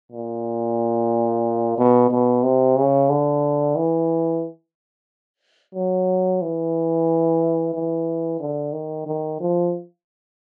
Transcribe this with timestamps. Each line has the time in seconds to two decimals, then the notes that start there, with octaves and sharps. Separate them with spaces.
0.12 A#2
1.77 B2
2.10 B2
2.43 C3
2.76 C#3
3.10 D3
3.76 E3
5.75 F#3
6.42 E3
7.74 E3
8.40 D3
8.72 D#3
9.06 D#3
9.40 F3